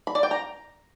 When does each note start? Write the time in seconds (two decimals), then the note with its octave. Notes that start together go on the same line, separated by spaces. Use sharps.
0.07 B5
0.15 D5
0.23 G5
0.31 A#5